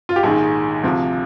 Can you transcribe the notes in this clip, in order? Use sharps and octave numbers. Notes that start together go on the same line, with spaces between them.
F4
G4
A#1 G#2 D#3 G#4
D2 C3 F3